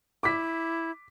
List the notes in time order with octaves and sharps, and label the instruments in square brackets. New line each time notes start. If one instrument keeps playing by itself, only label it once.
[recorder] E4 [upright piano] D6 B6